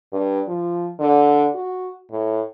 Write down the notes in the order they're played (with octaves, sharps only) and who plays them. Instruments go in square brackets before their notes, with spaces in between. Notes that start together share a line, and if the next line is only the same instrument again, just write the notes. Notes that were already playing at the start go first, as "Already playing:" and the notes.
[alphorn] G2
F3
D3
F#4
A2